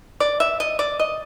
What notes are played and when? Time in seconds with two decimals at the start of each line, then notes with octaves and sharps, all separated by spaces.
0.20 D5
0.40 E5
0.60 D#5
0.79 D5
0.99 D#5